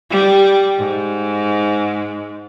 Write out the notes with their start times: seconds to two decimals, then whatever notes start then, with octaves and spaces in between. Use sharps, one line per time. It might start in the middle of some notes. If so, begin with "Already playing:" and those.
0.10 G3
0.78 G#2